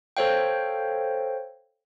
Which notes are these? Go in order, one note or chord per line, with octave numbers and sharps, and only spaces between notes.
A4 C5 C#5 F5 G5